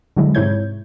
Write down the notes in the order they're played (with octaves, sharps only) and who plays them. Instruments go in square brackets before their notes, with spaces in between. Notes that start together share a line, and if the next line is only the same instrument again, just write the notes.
[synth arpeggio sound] D3 F#3 G#3 E4
G#2 C3 E4 C#5 G6 G#6